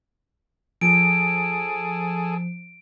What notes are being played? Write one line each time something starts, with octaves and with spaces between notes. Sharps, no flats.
F3 G#4 A4 D7